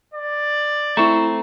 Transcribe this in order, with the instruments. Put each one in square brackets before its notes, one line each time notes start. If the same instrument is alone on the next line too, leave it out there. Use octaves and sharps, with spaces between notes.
[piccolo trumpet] D5
[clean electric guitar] A3 C4 [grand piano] E4 C#6 [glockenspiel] A#5